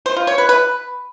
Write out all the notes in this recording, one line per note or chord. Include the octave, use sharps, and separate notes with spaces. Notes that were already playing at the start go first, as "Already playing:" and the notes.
C5
F4
C#5
B4
B4